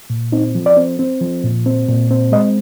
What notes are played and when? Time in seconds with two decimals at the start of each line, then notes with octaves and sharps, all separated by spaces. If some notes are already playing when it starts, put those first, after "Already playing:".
0.10 A#2
0.32 C4 D#4
0.55 F3
0.66 D5
0.77 C4
0.99 C4
1.21 F3
1.44 A#2
1.66 C4
1.88 A#2
2.11 C4
2.32 G#3 D#5